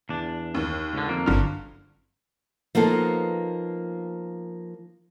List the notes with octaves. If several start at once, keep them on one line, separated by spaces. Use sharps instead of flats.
E2 D4
D#2
C#2 D3
F2 A#3
G1 G2 D3 F6
F3 A#3 B3 D#4 A4